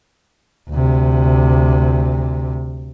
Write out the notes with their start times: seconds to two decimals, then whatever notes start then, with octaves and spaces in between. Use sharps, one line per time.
0.70 D2 C3